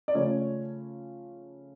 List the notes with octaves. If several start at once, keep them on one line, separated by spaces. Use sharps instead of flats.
D5
C#3 F3 A3 C#4 C#5